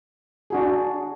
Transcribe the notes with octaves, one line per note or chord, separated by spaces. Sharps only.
D4 F#4 G#4